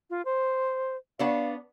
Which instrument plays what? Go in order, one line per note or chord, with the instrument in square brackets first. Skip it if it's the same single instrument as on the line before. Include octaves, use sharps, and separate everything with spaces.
[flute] F4
C5
[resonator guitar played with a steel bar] B3 D4 C#5 [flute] F5